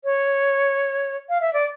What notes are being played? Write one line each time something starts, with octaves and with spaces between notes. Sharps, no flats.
C#5
F5
E5
D5